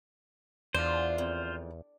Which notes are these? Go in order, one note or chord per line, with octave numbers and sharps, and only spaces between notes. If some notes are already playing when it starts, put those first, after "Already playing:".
E2 D4 F4 C5
F2